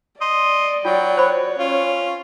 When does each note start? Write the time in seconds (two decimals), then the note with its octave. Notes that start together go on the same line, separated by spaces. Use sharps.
0.21 D5 D#5 C6
0.85 F#3 F4 G5
1.17 C5 C#5 B5
1.59 C#4 F4